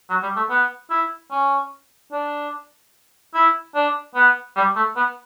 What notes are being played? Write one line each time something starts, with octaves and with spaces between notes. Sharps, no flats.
F#3
G3
A3
B3
E4
C#4
D4
E4
D4
B3
G3
A3
B3